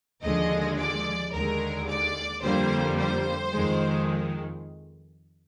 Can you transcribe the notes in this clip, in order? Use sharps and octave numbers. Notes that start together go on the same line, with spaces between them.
D#2 D3 F3 G#3 D#5
D5
D#2 D3 G#3 A#4
D5
F2 D3 G3 A#3 C5
C5
F2 D#3 G#3